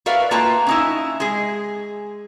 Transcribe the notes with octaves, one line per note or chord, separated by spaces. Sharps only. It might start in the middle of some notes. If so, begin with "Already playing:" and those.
F#4 A#4 B4 D5 E5 F5
A#3 F4 B4 G5 A5 A#5
C#4 D#4 E4
G#3 G#4